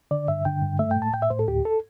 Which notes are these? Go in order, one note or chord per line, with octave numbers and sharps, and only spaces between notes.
D3 D5
G2 E5
D3 G5
G2
A3 E5
G5
A2
A5
A2 G5
E5
A2 C5
A4
D2 G4
A4